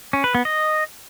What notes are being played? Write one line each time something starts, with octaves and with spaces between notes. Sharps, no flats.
C#4
B4
B3
D#5